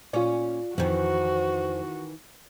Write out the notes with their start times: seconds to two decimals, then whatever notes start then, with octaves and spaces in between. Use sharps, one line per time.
0.13 A#2 C#4 F4 C#5 D5
0.78 F2 D#3 E3 F#4 C5